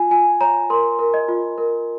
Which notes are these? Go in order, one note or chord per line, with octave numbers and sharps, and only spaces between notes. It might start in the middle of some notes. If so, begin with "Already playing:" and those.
Already playing: F4 G#5
F4 G#5
C#5 A#5
A#4 C6
A#4
D#5
F4
A#4